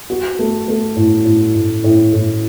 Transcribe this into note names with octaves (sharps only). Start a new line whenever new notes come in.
F#4
A3
A3
A2
A2
A2
A2
A2